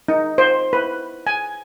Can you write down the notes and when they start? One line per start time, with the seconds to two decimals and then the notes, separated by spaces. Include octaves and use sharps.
0.08 D#4
0.38 C5
0.73 B4
1.27 G#5